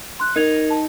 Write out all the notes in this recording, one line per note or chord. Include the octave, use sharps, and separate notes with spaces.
C6 F#6
D#4 A#4 G#6 F7
A5